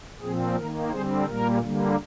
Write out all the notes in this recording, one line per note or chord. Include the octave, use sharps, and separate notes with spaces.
A#2 F3 C4 G#4
D#3 A#3 A#4
D3 G3 C4 G#4 C5
A#2 G3 A#3 A#4
D3 G3 A#3